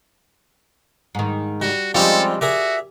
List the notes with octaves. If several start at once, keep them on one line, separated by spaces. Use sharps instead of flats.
G#2 D#3
G3 F#4
F3 G3 G#3 C4 C#4 D#4 G4 A4
F#4 G#4 A#4 D5 E5